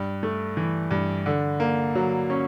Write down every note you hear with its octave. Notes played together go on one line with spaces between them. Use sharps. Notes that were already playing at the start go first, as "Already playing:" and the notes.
Already playing: G2
A3
E3
G2
D3
A#3
F#3
C#4